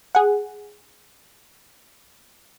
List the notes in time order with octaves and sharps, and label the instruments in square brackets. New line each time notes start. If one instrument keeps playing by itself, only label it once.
[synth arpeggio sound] G#4 F#5